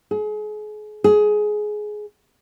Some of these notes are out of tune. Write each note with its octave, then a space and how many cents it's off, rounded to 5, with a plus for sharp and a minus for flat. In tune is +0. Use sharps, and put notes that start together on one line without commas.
G#4 +35
G#4 +15